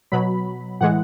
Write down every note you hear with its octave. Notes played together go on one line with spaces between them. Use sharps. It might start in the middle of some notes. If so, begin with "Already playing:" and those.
B2 F#3 B5
A2 E3 G#3 F#5